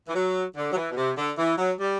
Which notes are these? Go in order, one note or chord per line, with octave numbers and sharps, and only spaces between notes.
E3
F#3
D3
F#3
E3
B2
C3
D3
E3
F#3
G3